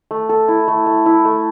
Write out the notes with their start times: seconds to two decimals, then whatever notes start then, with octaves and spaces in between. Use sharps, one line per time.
0.11 A3
0.29 A4
0.48 E4
0.68 A3
0.86 A3
1.06 E4
1.25 A3